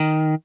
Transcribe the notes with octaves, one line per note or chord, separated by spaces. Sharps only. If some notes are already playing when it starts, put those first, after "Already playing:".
Already playing: D#3